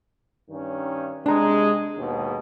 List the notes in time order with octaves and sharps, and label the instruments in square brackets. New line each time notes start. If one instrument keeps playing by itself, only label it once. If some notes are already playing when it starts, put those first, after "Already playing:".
[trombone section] G2 D#3 C#4
[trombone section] C3 G#3 [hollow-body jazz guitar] D4 A#5
[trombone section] D#2 G#2 B2